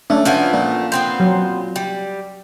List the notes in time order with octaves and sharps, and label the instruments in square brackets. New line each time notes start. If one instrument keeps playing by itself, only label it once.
[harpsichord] A3 [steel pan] C#4 D4
[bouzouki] F3 A3 B3 [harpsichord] F#4 G#5
[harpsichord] A#2
[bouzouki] B3 C4 C5
[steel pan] F#3
[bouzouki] G3